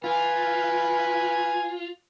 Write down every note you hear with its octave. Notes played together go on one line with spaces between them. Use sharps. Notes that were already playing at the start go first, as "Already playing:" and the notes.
F4 B4 G#5